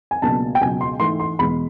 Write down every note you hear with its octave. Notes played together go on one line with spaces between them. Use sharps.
G#5
C#2 B2 F#3 A#3 D4 A5
G5
C#2 B2 F#3 G#5
C6
G#2 E3 A3 C6
C6
E2 B2 G#3 B5